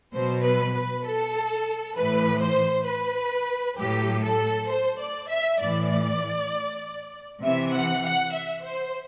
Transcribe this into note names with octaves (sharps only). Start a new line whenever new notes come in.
B2 F#3 C5
B4
B4
A4
A2 E3 B4
C5
B4
A2 F#3 G4
A4
C5
D5
E5
A2 E3 D5
C3 E3 E5
F#5
F#5
E5
C5